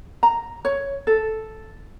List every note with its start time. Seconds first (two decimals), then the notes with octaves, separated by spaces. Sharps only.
0.23 A#5
0.65 C#5
1.07 A4